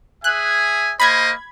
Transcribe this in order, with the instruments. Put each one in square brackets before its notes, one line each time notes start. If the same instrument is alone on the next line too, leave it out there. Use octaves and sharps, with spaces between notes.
[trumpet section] G#4 E5 G#5 [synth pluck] F#6
[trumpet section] A#3 C5 D#5 [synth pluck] B5 G#6